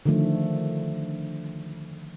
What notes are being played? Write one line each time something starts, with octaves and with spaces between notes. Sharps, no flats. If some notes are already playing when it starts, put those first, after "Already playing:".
D3 D#3 F3 A3